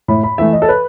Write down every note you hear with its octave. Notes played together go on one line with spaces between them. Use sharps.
A2 B5
B5
E3 A3 E5
D#5
A4
B4